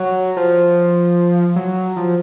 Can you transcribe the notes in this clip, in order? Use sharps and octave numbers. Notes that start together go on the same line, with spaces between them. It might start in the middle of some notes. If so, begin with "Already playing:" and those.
Already playing: F#3
F3
F#3
F3